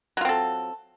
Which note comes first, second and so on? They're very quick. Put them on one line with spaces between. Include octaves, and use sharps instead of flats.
F#3 F4 C4 A4